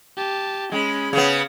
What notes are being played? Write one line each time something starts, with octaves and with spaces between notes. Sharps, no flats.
G4 A5
G#3 C#4 B5
C#3 B3